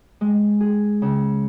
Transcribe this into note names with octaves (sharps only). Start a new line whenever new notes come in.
G#3
G#4
C#3